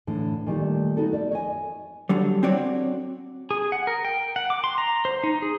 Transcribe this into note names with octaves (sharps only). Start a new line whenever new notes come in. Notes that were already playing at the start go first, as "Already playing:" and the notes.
A2 D3 E3
A#2 D#3 G3 A3
B3 D#4 F#4 A4 A#4
A#4 D5 E5
C#5 D#5 G#5
D3 F#3 G3
C4 D4 F#4 C#5 D5
G#4
F#5
A#4
G5
F#5
D6
C6
A#5
C5
D#4
G#4